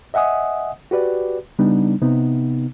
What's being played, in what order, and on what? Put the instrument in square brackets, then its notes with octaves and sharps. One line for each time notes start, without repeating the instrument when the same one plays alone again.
[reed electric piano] D#5 E5 F#5 G#5 D#6
F#4 G4 B4 D5
C#3 G3 B3 D4 D#4
C3 B3 D#4